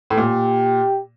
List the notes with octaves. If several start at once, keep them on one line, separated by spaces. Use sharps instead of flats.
A2
A#2 G4